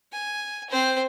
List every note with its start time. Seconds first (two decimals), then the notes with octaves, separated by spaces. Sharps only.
0.12 G#5
0.70 C4 C5